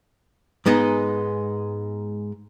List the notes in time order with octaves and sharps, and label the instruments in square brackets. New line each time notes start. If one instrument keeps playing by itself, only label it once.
[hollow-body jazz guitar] G#2 G#3 B3 D#4